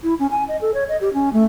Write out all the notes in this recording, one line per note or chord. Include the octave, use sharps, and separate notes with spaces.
E4
C#4
G#5
D#5
A4
C#5
D#5
G4
C#4
A3